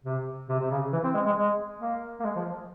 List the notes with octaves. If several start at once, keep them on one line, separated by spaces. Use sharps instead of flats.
C3
C3
C3
C#3
E3
C4
G#3
G#3
G#3
A#3
A#3
G#3
F3